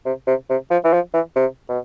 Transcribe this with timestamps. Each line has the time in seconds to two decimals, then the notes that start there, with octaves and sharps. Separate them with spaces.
0.06 C3
0.27 C3
0.50 C3
0.71 F3
0.84 E3
0.93 F3
1.14 E3
1.36 C3
1.69 B2